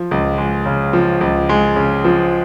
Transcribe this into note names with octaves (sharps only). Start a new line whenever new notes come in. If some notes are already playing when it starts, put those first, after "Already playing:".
Already playing: F3
C#2
G#3
C#3
F3
C#2
G#3
C#3
F3